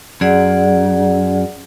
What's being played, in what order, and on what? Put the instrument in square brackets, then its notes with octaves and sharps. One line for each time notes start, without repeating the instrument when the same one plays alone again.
[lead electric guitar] F#2 [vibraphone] G#4 D5 F#5